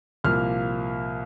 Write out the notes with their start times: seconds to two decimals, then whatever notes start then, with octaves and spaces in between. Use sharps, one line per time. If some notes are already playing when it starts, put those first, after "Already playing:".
0.24 C2 A#2 F3 A#3 F6